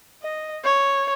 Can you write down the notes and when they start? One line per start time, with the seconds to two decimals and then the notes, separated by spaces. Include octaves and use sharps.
0.22 D#5
0.64 C#5